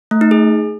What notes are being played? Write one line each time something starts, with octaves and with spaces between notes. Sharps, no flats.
A3
D#4
G#4